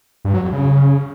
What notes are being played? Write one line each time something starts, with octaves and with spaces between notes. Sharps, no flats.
G2
F#3
F2
C#3